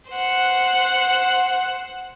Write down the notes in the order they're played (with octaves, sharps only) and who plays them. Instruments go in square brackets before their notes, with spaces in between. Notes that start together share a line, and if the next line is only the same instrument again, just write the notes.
[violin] C5 F#5